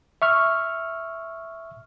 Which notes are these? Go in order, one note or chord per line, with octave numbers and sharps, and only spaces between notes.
E5 C#6 F6